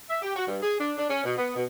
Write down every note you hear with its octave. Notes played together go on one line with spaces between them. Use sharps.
E5
G4
F#4
G2
G#4
D4
D4
C#4
B2
B3
B2